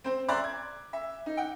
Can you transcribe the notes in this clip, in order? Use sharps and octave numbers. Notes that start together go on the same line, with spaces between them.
C4 C5
D5 E5 A#5 C6 D6 F#6
G#6
E5
D#4
F#5 G5